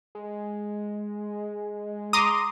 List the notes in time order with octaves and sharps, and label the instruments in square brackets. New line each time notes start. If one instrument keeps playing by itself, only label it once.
[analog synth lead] G#3
[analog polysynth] A#5 C6 D6 [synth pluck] D#6